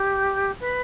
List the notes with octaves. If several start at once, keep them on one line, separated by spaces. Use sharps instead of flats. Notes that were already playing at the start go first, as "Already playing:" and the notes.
Already playing: G4
B4